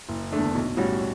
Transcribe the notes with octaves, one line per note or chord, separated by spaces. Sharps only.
F#1
E2 D3 A3 D4
B1
A2 G3 C#4 F#4